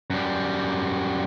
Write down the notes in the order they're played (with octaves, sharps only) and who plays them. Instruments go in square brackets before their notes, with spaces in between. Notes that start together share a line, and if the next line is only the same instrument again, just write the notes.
[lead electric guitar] F#2 G3